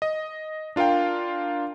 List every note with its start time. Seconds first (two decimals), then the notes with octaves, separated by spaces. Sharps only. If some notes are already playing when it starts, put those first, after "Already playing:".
0.02 D#5
0.76 D4 F4 A#4 F5 G5